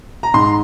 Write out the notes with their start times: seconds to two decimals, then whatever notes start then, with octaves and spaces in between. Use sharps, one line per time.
0.23 A#5
0.34 G#2 C6